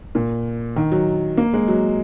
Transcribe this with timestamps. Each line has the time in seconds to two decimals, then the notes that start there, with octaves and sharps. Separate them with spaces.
0.15 A#2
0.76 D#3
0.92 F#3
1.37 A#3
1.54 G#3
1.68 F#3